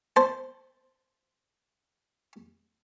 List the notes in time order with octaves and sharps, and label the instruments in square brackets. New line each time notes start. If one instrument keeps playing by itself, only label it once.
[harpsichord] C5 A5